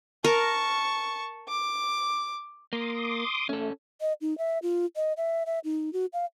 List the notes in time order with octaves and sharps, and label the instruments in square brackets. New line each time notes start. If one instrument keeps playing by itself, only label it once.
[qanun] A#4 [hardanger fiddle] A5 C#6
[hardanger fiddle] D6
[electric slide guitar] A#3 [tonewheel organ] C6 D6 D#6
[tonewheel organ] A3 [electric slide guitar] C#4 A4
[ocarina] D#5
D#4
E5
F4
D#5
E5
E5
D#4
F#4
F5